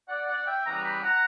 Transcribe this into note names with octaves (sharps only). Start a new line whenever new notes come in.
D5 F#5
D5 F#5
E5 G5
C#3 E3 G3 B3 F#5 A#5
G5 B5
F#5 A#5